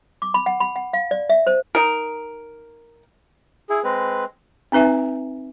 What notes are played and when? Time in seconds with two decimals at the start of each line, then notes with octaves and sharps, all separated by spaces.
0.22 D6
0.34 B5
0.46 F#5
0.60 B5
0.76 F#5
0.93 F5
1.11 D5
1.29 E5
1.47 C5
1.75 D#4 A#4
3.70 E4 G#4
3.84 G#3 C4 B4
4.72 C4 D#4 B4 E5 G#5